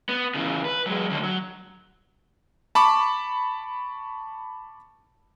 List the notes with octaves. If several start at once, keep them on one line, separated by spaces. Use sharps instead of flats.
B3
C#3 E3
B4
F#3 G#3
D#2 D3
F#3
A5 B5 C#6 D6